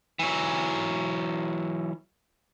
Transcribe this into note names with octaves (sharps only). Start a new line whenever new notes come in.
E3 F#3